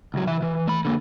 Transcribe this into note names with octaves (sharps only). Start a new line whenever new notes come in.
C#2 F#3
E3 E5
E3
A3 B5
D3 A#3